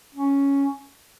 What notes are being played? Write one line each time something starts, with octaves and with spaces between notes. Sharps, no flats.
C#4